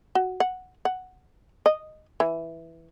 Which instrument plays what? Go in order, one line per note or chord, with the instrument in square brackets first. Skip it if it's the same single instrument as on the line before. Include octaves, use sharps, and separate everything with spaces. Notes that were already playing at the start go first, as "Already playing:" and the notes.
[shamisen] F#4
F#5
F#5
D#5
E3